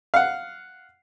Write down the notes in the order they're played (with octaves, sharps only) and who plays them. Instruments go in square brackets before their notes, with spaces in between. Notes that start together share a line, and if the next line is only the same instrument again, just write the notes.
[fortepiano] F5 F#5